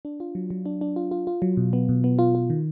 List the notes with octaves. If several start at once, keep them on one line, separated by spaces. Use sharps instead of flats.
D4
F4
F#3
F#3
D4
D4
F4
F4
F4
F#3
B2
B3
B2
B3
F4
F4
D#3